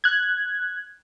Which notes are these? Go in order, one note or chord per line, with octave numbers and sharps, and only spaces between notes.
F#6 G#6